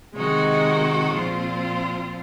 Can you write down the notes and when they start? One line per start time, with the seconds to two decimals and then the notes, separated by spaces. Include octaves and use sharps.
0.14 C3 D#3 G#3 D#4 F#4
1.14 A#2 F3 C4 F4